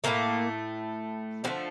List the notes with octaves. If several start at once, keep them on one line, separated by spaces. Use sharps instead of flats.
A2 F3 A3 A#3
D3 F3 A3 C4